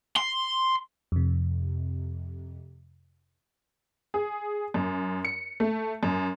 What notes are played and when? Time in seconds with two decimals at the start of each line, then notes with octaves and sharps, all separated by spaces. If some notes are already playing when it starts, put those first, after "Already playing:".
0.17 C6
1.12 F2 C3
4.14 G#4
4.74 F#2
5.25 C#7
5.60 A3
6.03 F#2